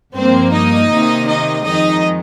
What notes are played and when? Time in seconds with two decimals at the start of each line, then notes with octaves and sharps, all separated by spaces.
0.14 G2 F3 A#3 C4 C5
0.52 D#4 D#5
0.90 C3 D#3 A#3
1.27 D#4 D#5
1.64 F2 D#3 G#3 D#4 D#5